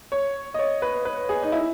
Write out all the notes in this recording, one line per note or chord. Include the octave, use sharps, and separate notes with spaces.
C#5
D#5
C#5
B4
B4
G#4
D#4
E4